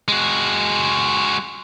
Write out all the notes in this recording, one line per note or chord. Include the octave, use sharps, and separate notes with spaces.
G#3 F#4